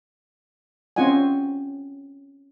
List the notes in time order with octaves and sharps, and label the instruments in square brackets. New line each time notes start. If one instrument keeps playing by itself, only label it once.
[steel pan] C4 C#4 F4 D#5 F#5 G#5